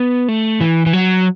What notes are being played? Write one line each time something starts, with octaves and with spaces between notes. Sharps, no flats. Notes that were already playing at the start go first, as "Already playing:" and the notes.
Already playing: B3
A3
E3
E3
F#3